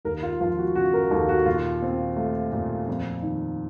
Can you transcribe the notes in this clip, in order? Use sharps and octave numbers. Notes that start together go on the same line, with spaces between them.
D#2 A#4
F4
F3 F4
F#4
C#3 F#4
A#4
D#2 A4
F#4
A#2 F4
C4
A3
A#2
F2
D#3